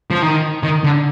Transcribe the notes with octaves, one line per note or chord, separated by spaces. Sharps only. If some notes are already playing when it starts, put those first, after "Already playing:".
F3
D#3
D#3
D3